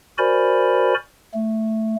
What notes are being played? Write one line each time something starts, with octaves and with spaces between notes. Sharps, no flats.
F#4 A#4 C5 D5 G#5 B5
A3